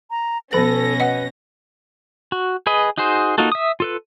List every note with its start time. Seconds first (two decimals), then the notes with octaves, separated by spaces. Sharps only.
0.11 A#5
0.53 B2 F3 C#4 A4 B4 A#6
1.00 B4 D#5 F#5
2.32 F#4
2.67 G#4 B4 D#5
2.98 D#4 F#4 G#4 C5
3.38 A#3 D#4 F4 F#4 A4
3.52 E5 D#6
3.80 F4 A4 B4